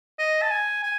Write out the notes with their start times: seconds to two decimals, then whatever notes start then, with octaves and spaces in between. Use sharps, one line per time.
0.19 D#5
0.42 A5
0.51 G#5
0.83 G#5